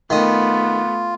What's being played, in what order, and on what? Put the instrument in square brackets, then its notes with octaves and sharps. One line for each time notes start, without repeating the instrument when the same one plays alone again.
[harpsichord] D#3 D#6 [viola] A3 B3 [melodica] F4